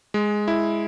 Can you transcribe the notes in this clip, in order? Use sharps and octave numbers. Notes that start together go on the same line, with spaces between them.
G#3
E4